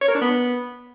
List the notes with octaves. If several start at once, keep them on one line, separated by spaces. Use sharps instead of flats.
C#5
A#4
D4
B3